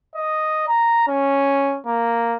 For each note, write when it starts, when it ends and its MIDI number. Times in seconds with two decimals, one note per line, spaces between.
0.16 0.64 75
0.68 1.06 82
1.08 1.77 61
1.87 2.36 58